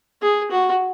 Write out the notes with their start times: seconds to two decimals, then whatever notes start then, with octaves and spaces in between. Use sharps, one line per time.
0.22 G#4
0.51 F#4